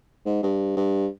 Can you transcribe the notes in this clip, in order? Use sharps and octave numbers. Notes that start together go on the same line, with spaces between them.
G#2
G2
G2